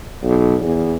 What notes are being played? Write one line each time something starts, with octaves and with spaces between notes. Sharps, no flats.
B1
E2